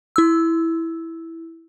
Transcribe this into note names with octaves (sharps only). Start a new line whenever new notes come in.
E4 E6